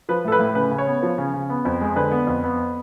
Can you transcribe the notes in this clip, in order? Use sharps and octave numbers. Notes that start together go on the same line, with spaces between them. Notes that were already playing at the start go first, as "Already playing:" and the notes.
F3 B4
A2 A4
B4
A2
C#3 B4
C#3
C#5
B3
F3
C#3
C#3
B3
F2
G#3
D3 B4
B3
F2
B3